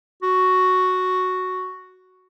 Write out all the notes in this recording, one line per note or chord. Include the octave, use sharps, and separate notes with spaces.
F#4